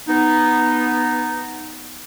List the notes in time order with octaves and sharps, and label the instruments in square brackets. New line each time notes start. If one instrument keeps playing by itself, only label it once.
[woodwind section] B3 D#4